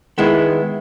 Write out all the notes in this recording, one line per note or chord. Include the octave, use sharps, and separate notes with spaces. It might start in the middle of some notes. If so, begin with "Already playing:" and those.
D#3 G#3 B3 E4